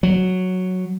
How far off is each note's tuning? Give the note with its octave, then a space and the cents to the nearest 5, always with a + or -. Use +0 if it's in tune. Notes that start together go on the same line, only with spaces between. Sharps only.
F#3 -5